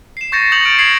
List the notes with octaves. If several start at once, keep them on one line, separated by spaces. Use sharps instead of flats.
C7 E7
C#6 G6 A6 A#6 C#7 E7
C#6 D#6 G6 C#7 F7 F#7
F6 D7
G#6 C7 F#7